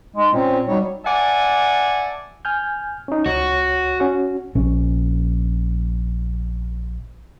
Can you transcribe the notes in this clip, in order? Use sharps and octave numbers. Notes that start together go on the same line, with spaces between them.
G#3 D#4
A#2 C4 C#4
F#3 G3 D#4 C#5
D5 E5 F#5 G#5 A5
G#5 F6 G6
C#4 D#4
C#2 F#4 C#5
C#4 F#4
A#1 C#4